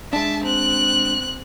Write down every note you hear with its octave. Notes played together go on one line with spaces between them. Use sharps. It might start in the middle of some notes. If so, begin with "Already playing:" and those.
G#3 D4 E5 A5
C4 F#6